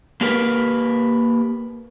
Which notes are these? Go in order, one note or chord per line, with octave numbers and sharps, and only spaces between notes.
A#3 G4 A#4 B4